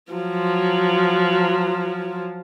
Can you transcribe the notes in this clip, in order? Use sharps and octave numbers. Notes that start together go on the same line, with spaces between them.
F3 F#3